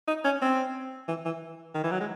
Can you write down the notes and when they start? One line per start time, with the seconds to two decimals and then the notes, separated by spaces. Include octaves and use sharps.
0.08 D#4
0.25 C#4
0.42 C4
1.08 E3
1.26 E3
1.75 D#3
1.84 E3
1.91 F#3
2.01 G#3